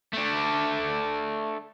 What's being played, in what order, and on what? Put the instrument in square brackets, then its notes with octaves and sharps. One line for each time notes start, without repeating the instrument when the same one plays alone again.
[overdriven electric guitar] A3 D4